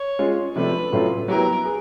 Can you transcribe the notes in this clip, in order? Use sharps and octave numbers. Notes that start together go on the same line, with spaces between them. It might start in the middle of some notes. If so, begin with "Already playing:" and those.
Already playing: C#5
G#3 C#4 F4
C3 F3 A3 D4 B4
A2 F#3 A3 C#4 F4
F#3 B3 E4 G4 A#4 B4
G#4